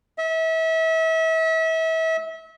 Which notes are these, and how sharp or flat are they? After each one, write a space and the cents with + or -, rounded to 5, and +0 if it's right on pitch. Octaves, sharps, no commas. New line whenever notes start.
E5 -35